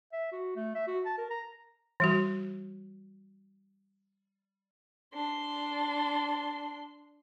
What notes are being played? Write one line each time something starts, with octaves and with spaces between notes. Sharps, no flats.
E5
F#4
A3
E5
F#4
A5
A#4
A#5
E3 G3 F#4
D4 C6